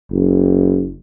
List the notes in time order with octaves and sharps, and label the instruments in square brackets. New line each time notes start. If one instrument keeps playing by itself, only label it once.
[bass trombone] F#1